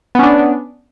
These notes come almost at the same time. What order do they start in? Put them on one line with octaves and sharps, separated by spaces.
B3 C#4 D4